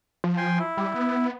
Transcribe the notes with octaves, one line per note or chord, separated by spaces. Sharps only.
F3
G5 G#5 C6
E4
G3
B3